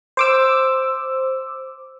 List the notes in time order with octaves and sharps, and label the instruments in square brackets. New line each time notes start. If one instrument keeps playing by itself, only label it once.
[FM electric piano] C5 D6 E6